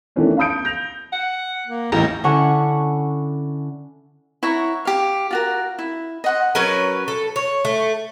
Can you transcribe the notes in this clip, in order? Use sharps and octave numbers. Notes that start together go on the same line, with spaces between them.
D#3 E3 A3 B3 C#4 D4
F5 A5 B5 D#6 G6 D7
G6 A#6 F7
F#5
A#3
A1 D#2 A2 A#5
D3 C#4 E4 F#5 G#5 C#6
E4 C#5 F#5 A#5
G4 F5
F4 F#4 A#4
E4
D#5 F#5 C6
F#3 C#4 A#4 B4
A4
C#5
A3